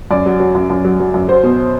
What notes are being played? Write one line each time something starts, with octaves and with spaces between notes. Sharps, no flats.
F#2 D5
F#3
F#3
F#2
F#2
F#3
F#3
F#2
F#3 C5
B2